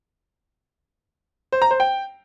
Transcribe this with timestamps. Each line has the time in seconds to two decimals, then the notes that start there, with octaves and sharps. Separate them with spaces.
1.52 C5
1.62 A#5
1.71 C5
1.80 G5